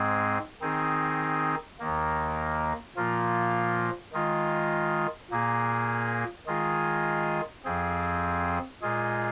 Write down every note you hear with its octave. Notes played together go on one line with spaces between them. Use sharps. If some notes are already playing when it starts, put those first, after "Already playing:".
Already playing: G#2 G#3 C4 G#4
D#3 C4 D#4 G#4
D#2 D#3 A#3
A#2 F3 A#3 F4
D#3 G#3 F4
A#2 A#3 G#4
D#3 G#3 F4 G#4
F2 F3 C4 G#4
A#2 G#3 F4 G#4